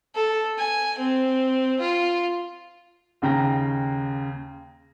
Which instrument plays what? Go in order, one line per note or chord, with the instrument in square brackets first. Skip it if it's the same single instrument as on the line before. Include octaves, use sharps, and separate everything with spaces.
[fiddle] A4
G#5
C4
F4
[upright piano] D#2 C#3 G5 A#5 A#6